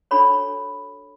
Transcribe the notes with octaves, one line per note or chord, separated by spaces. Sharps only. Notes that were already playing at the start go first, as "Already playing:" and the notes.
D4 F#4 A4 C#5 B5